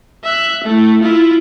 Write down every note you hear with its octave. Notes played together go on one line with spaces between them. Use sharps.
E5 F#6
A3 E4
E4 F4